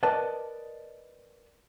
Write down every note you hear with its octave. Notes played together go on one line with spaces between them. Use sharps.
A#4 B4 D5 D#5 F#5 A5